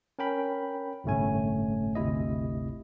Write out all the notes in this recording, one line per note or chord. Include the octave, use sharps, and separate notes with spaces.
C#4 A#4 G5 B5
G1 C2 A2 A3 C#4 G#5
G1 D2 C3 E4 D#5